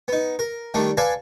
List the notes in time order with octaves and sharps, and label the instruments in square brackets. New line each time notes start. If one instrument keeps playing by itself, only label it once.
[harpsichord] B3 D#4
A#4
D#3 G3 A3 D4
A4 B4 D5 F5 G#5 A5